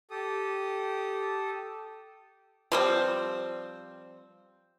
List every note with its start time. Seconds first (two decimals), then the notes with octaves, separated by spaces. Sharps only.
0.11 G4 A4 D#6
2.72 F3 G3 C4